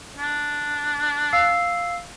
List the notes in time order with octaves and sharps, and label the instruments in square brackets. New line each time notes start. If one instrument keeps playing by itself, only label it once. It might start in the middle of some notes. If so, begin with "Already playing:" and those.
[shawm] D4
[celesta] F5 E6 C7